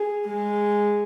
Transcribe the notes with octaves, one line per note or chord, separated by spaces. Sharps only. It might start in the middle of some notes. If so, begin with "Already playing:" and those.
Already playing: G#4
G#3